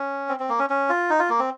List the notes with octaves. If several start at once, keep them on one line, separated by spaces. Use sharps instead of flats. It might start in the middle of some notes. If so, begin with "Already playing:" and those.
Already playing: C#4
C4
C4
A#3
C#4
C#4
F4
D#4
F4
A#3
C4